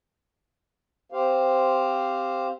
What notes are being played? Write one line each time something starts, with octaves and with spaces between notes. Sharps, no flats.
C4 G4 C5 F5